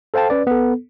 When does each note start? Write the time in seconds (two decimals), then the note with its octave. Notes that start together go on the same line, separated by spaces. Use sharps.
0.14 A4 C5 F5 G5 A5
0.30 C#4 B4 D5
0.47 B3 A4